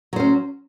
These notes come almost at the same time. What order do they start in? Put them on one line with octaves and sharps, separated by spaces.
F#3 C5 C#4